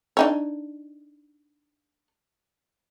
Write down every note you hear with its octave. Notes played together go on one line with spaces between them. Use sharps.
D4 D#4 C#5